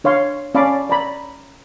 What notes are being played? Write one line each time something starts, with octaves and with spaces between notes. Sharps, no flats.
D4 C#5 F5 C6
C#4 D5 F5 A5 B5 D6
D5 A#5 B5